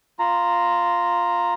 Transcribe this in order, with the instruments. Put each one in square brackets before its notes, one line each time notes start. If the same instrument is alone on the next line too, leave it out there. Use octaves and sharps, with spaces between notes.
[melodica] F4 A#5